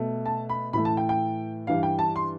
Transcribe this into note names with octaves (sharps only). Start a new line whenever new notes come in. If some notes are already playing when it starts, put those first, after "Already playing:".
Already playing: B2 A3
A5
B5
A2 E3 A3 B5
A5
G5
G5
G2 E3 G3 F5
G5
A5
C6